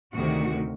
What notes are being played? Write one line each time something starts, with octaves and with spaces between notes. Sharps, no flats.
D2 C3 D#3 F#4